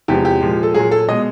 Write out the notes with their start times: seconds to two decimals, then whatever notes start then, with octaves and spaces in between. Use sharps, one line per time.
0.08 E2 C3 F3 G#3 G4
0.25 G4
0.41 A#2 F3 G#3
0.63 A4
0.74 A#2 F#3 G#4
0.91 A4
1.08 B2 G#3 D#5